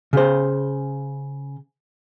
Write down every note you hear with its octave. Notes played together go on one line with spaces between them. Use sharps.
C#3 C5